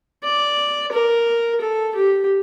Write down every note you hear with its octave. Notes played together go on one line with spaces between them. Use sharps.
D5
A#4
A4
G4